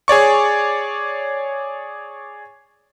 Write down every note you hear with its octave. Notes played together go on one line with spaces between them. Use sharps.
G#4 C#5 D5 C#6